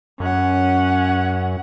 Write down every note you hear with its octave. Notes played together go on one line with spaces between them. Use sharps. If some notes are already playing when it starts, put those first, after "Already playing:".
F#2 C#4 F#5